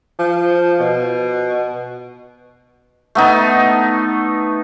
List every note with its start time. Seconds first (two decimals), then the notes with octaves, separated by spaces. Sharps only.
0.19 F3
0.80 B2
3.15 A3 B3 D#4